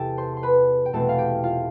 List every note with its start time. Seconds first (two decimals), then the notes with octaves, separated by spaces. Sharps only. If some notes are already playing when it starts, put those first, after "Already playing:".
Already playing: E2 C3 G4 A4 G5 A5
0.17 C5 C6
0.37 C6
0.43 B4 B5
0.86 G5
0.93 E2 B2 A3 C4 A4 A5
1.09 F5
1.18 G4 G5
1.43 F4 F5